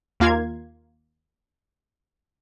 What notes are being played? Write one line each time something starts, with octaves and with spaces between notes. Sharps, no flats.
D#2 A#3 F4 F5 G#6